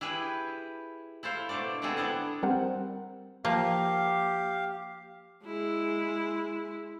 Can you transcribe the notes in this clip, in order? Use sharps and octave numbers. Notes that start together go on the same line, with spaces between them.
E4 G4 G#4 B4
E4 A4 C5 F5
B2 A3 D4 A4 D5
D3 B3 C4 E4 G#4 A4
B3 D4 A4 F#5
G3 C4 A#4 C5 F#5
F3 A#3 G4 F5
G#3 E4